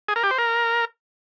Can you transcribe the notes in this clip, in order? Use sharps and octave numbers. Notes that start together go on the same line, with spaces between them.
G#4
A#4
G4
C5
A#4